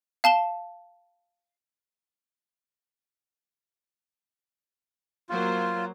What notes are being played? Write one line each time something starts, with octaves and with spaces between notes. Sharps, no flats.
F5 A5 E7 G7
F#3 A#3 F4 C5